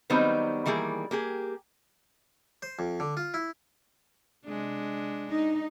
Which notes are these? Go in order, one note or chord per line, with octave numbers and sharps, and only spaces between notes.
D#3 F#3 G3 B3 C4 D#4
D#3 E3 G3 A#3 G#4
A#3 G4 G#4
C5
F2
D3
F4
E4
C3 G#3 D4
D#4